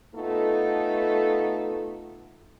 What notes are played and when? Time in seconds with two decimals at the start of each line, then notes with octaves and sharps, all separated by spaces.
0.15 A3 B3 D#4 F4 A4